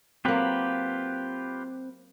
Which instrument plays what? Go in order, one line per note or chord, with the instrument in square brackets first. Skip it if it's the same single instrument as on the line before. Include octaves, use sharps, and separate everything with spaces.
[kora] F#3 A#3 [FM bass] C4 [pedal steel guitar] F4 G4 B4